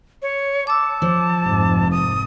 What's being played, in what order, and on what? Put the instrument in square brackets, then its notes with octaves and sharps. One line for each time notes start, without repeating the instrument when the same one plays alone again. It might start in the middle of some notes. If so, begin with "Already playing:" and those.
[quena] C#5
[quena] A5 [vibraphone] D6 E6
[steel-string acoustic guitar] F3
[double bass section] F1 G#2 C3
[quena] D#6